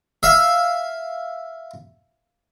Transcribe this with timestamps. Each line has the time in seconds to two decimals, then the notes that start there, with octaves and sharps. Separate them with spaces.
0.23 E5 F5